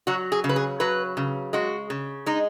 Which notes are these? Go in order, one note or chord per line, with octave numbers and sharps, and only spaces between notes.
F#3 F#4
G#4
C#3
B4
G#4
F#3 B4
C#3
G#3 F#4
C#3
G#3 D#4